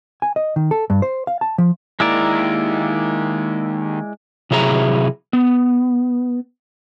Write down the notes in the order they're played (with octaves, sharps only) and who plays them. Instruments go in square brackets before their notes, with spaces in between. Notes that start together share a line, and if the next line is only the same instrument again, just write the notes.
[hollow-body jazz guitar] G#5
D#5
D#3
A4
G2
C5
F5
A5
F3
[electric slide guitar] D#3 A#3 A#5 [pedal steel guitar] G#3 E4 D5
[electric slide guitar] C3 F#3 E4 G#4 D5 A#5
B3